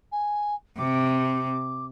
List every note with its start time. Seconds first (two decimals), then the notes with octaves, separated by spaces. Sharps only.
0.12 G#5
0.79 C3 D6